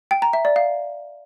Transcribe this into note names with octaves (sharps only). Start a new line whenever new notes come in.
G5
A#5
E5
D5
F5